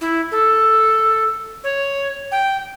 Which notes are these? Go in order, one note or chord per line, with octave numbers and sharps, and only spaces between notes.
E4
A4
C#5
G5